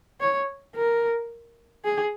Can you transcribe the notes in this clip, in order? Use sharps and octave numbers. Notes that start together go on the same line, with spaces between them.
C#5
A#4
G#4